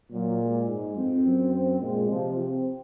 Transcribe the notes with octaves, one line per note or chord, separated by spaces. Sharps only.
A#2 F#3
G#3
G#2
F2 C4
F#2
C4
A#2 G#3
C3 F3
C4